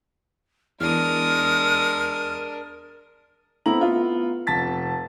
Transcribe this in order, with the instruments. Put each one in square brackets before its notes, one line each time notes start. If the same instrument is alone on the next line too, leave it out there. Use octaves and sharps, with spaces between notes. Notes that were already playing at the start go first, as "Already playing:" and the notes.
[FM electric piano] E2 [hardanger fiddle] G#3 D#6 [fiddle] D4 A#4 [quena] F6
[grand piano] A3 B3 C4 E4 A#5 F#7
B3 F4
F1 A5 A6 B6